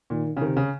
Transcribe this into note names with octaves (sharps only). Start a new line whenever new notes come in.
A#2 D#3
C#3
C3 D#3
C#3